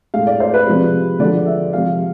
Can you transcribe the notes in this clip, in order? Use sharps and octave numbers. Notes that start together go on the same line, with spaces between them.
A2 G#3 F5
D5
C5
B4
C3 F3 G#3
D3 F3 G#3 D5
E5
C3 F3 G#3 F5